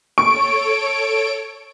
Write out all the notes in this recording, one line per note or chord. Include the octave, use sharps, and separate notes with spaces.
A4 C#5 C#6 D7